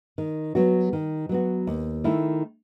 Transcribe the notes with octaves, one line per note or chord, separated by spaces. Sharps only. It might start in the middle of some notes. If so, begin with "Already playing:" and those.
D#3
F#3 B3 F#4
D#3
F#3 B3 F#4
D#2
D#3 A3 E4